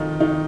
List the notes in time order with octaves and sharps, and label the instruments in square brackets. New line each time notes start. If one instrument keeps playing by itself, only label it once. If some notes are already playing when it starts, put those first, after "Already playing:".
Already playing: [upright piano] D#3 F3 D#4 F4
D#3 D#4